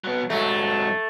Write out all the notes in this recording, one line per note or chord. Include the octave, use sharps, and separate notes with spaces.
F#3 B3
G#2 F#3 A3